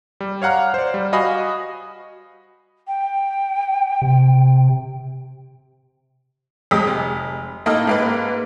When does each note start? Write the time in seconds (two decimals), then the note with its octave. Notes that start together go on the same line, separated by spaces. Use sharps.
0.21 G3
0.42 C#5 F5 F#5 A#5 F6
0.74 C5 D5
0.94 G3
1.13 F#4 D#5 F5 G#5 B5 D#6
2.87 G5
4.02 C3
6.71 F2 G#3 G4 D#6 B6
6.87 F1
7.66 A2 A#3 D#4 A4 D#5 F6
7.87 G#2 A#3 B4